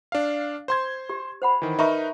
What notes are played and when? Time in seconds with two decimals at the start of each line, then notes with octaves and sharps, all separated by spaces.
0.12 D4 F5
0.68 C5 C6 G#6
1.09 G4
1.42 C5 F#5 B5
1.62 D#3 E3
1.79 D#4 A#4 B4 E5 A#5 C#6